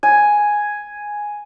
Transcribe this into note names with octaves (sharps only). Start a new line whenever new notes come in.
G#5